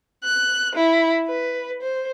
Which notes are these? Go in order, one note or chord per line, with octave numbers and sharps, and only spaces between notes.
F#6
E4
B4
C5